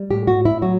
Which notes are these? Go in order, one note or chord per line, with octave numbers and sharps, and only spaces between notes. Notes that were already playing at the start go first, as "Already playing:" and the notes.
Already playing: G3
A2 G4
F#4
A2
E4
F#3 F#4